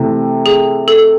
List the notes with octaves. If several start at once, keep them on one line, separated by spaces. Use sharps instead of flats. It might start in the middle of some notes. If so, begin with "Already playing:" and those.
Already playing: C3 E3 A3 C4
G#4
A4